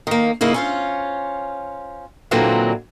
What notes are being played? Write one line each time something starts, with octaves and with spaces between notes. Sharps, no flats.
D#3 A#3
C#3 A#3 D#4 E4
C#4 F4 C5
A#2 D3 E3 F#3 A#3 C4